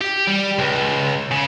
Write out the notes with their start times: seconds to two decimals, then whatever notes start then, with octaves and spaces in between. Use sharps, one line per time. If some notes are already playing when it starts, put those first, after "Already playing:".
0.01 G4
0.27 G3
0.59 C#2
1.31 C#3